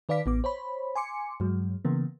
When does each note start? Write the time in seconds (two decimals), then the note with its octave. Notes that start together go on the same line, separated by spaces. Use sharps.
0.09 D#3 B4 D5 F5 D6 B6
0.26 A1 B3 D6
0.44 C5 C#5 B5
0.95 G#5 C6 D6 C#7
1.40 G2 F#3 G#3
1.85 C#3 E3 A#3 B3